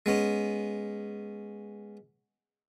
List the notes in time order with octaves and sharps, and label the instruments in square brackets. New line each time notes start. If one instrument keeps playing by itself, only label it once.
[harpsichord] G#3 B3 C#4